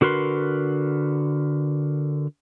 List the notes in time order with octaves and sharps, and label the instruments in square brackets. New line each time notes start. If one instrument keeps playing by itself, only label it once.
[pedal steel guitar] D3 F#4 A#4 B4 C6